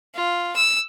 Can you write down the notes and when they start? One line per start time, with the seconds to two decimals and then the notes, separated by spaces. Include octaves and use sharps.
0.14 F4
0.56 E6